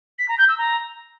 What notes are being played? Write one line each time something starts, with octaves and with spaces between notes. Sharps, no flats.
B6
A#5
G6
E6
A#5